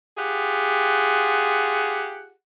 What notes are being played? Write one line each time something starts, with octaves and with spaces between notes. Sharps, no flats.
F4 G4 G#4 F#5